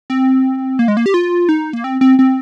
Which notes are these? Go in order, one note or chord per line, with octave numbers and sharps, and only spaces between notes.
C4
A#3
G#3
A#3
G4
F4
D#4
A#3
C4
C4
C4